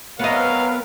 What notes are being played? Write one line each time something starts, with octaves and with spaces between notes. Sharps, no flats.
F#3 B3 C4 A#4 B4 D#5 F5